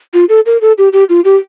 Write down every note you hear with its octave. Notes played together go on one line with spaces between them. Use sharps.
F4
A4
A#4
A4
G4
G4
F4
G4